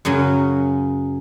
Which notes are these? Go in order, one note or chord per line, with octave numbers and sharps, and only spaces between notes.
F#2 C#3 F#3 C#4